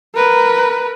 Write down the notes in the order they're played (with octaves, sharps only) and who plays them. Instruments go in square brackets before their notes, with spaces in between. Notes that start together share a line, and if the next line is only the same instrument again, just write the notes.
[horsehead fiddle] A#4 B4